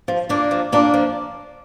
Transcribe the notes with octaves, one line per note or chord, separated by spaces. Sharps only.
F3
A#2 A#3 D4
F3
A#2 A#3 D4
F3